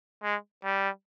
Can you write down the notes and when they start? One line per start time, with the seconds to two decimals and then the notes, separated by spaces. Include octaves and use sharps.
0.23 G#3
0.64 G3